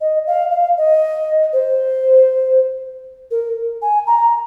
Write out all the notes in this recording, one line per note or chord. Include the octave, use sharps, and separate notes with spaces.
D#5
F5
F5
D#5
C5
A#4
G#5
A#5